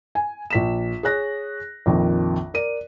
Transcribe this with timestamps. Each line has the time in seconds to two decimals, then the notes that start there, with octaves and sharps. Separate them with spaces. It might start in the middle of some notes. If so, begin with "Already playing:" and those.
0.15 G#5
0.50 A#1 B6 E7
1.03 G#4 C#5 F#6 A#6
1.86 A#1 F2 D#3
2.54 A#4 D5 D#7